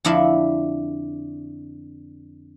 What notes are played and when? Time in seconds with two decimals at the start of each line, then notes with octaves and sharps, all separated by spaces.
0.05 F2 D3 D4 E4 E5 F5